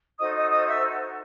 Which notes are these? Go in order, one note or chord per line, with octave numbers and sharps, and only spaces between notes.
D#4 F#4 A4 C5 D#5 D#6
D#5 D#6
D#5 D#6
E5 E6